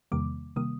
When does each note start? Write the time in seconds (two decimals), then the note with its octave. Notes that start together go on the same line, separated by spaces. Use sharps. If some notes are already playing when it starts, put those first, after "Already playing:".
0.12 E2 C3 D#3 G3 A#3 D6
0.56 C3 D#3 G3 A#3 D#6